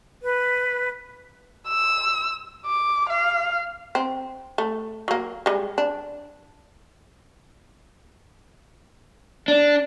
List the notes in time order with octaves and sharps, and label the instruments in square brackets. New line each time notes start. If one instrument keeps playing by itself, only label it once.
[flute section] B4
[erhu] E6
D6
F5
[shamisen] C4
A3
F#3 A#3
G3 G#3
D4
[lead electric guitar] D4